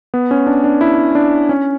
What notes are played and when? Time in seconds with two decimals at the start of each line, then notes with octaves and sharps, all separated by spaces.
0.14 B3
0.31 C#4
0.47 D4
0.64 D4
0.81 E4
1.15 D4
1.49 C#4